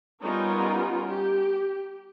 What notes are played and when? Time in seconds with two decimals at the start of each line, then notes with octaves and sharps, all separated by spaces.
0.22 G3 B3 C#4 D#4 F4 A#4
1.07 G4